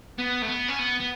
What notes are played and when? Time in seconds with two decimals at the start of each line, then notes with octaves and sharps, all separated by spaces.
0.18 B3
0.42 A3
0.48 B3
0.68 C#4
0.79 B3
1.00 B3